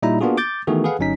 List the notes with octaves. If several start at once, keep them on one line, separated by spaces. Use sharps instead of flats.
A#2 G3 D#4 E4 E5 A#5
A#3 B3 D4 F4 F#4 G#4
D6 G6 A6
D#3 E3 A3 B3 F#4 G#4
G#4 A4 B4 F5 F#5
G1 F#3 C#4 D#4 B6